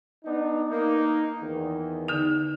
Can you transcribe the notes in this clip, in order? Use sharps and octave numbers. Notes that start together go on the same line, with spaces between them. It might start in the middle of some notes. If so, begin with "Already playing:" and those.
B3 D4 D#4
A#3 D#4
E2 D#3
D3 D#4